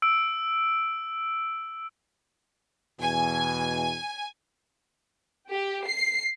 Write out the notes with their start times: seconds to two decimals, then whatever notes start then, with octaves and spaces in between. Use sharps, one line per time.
0.02 E6 D7
3.00 E2 B2 G#5
5.50 G4
5.86 C7